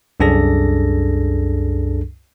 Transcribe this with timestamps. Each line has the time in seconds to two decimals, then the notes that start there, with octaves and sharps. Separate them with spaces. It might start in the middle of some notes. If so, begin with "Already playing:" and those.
0.20 C2 F#2 D4 G#4 A4 A#6